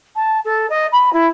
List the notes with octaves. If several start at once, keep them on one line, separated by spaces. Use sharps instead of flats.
A5
A4
D#5
B5
E4